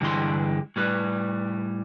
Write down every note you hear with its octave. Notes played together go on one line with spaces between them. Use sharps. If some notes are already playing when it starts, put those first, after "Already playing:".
G2 D3 E3 G#3 G4 C6
A2 G3 B4